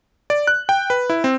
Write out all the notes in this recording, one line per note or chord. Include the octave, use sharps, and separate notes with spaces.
D5
F#6
G5
B4
E4
C4